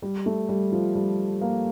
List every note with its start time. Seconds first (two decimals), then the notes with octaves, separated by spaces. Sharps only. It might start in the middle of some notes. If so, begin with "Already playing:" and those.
0.02 G3
0.26 A3
0.49 G3
0.72 F3
0.95 G3
1.41 A#3